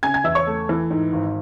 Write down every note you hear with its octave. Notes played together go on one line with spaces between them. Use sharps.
C#3 G#5 G#6
G#5 G#6
E2 E5 E6
C#5 C#6
A3
E3
G#2
G#1